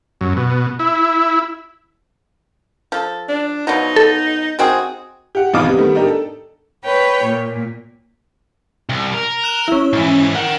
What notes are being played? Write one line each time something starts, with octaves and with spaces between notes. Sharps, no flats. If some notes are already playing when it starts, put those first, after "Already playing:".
F#2
B2
E4
F3 A4
D4
B2 F3 F#3 D#4
A4
D#3 C4 F#4 G#4
G4 F#5
G#1 E2 B2 D#4 F5 D6
C3 G3 B3
D#3 G3 A3 B3
D4 D#4 G4 A#4
A4
B4 C#5 G5
A#2
C2
A#4
F#6 E7 G7
C#4 E4
G#2 E3
A#4 F#5 G5